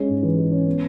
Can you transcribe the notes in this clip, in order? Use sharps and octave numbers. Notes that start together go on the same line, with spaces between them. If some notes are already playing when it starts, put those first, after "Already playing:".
Already playing: G#3 C#4
G#2
E3
G#3
C#4
B3